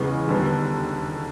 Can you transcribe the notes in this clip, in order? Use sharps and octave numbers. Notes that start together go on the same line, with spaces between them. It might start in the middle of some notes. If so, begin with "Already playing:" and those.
Already playing: E2 C#3 E3 G#3 B3
D#2 D3 G3 B3